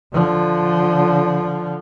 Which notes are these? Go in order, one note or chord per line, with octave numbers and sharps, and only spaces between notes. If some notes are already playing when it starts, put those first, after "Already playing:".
D3 F3